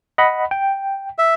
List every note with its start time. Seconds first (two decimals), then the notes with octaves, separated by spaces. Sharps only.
0.18 D#5 F#5 B5
0.51 G5
1.18 E5